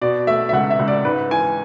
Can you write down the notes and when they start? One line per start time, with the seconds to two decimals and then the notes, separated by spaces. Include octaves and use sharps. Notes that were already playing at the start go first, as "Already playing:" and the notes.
0.02 B2 D5
0.27 A3 E5
0.49 E5
0.53 C#2 F#5
0.70 E5
0.79 C#2
0.88 D5
1.05 G#2 B4
1.31 E3 G#5